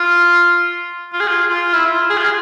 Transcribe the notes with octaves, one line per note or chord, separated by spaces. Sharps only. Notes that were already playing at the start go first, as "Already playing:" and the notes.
Already playing: F4
F4
G#4
F4
F4
E4
F4
G#4
F4
G#4